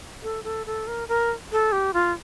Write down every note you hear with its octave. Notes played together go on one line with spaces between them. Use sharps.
A4
A4
A4
A#4
A#4
A4
G4
F4